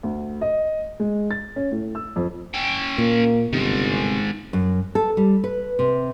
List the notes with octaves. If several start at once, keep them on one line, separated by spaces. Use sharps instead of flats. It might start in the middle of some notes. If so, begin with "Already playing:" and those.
D2
D#5
G#3
A6
C#4
A2
E6
F2
C#4 G5
A#2 A#3
G1 C3 D#3 G#3
F#2
A4
G3
B4
C3